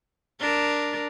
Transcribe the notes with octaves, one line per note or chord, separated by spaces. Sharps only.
D4 A#4